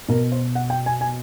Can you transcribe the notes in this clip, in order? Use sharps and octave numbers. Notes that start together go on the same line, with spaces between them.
B2 A#4
C5
F#5
G5
G#5
G#5